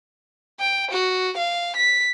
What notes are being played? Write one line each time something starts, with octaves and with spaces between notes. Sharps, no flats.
G5
F#4
F5
B6